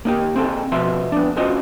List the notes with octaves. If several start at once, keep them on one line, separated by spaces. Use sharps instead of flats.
A#3 D#4 G4
C4 G#4 A4
B2 F3 E5 C6
B3 D4
C#4 D#4 F4 F#4 C5 D#5